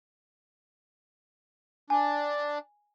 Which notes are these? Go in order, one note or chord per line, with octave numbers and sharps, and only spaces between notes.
D4 G#5